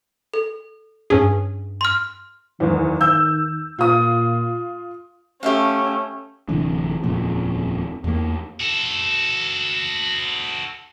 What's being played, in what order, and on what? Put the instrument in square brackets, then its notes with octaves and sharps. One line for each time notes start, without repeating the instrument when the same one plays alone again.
[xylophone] A4
[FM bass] G2 [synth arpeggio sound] C#4 G#4
[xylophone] C6 F6
[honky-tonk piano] F#1 E2 [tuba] D#3
[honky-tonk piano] E6 G6
[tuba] A#2 [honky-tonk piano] F4 D#6
[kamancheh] A3 C#4 [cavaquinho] G4 E5 F5
[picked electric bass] D1 C3 E3 D4
D#1 F2 A#2 C#3
E2 A#3
[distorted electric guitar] F#4 A4